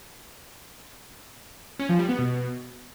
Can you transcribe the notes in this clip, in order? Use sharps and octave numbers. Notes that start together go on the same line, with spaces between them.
C#4
F3
G3
B3
B2